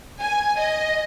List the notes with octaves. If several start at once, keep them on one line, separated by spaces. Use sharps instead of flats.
G#5
D#5